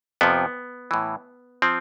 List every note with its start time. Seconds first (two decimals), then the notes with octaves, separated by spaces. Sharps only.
0.21 F2 C3 F3 B3
0.91 A2 E3
1.62 F3 C4